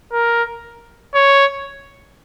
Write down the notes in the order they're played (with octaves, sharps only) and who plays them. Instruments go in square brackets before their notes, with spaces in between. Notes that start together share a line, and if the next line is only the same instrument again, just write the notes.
[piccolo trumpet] A#4
C#5